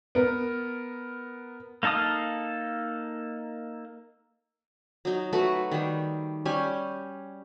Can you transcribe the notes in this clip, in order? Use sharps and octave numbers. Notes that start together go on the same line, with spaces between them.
B3 A#4
A#3 D#4 A4 F5 D#6
F#3 D#4
A3 F#4 B4
D#3 G3
G3 C#4 G#5